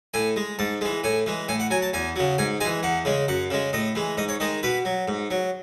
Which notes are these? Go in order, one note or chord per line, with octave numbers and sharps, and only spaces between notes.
A2 G#5
G#3
G#2 A5
E3 G#3
A2 G#5
E3 G#3
A2 G#5
F#5
F#3 G#5
A5
E2 G#5
C#3 F#3
G#2 G#5
E3 G#3 G#5
E2 F#5
C#3 G#3
F#2 F#5
C#3 G#3
A2 D#5
E3 G#3
G#2 D#5
C#5
D#3 G#3 D#5
B2 B4
F#3
G#2
F#3